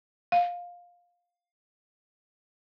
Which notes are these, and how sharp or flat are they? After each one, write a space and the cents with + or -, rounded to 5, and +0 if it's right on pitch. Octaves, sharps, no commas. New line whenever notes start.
F5 +15